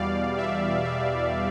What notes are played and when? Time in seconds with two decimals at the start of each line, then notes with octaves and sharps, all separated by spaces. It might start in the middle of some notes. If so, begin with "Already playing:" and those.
Already playing: E2 B2 G3 D5 F5
0.38 E5
0.84 E5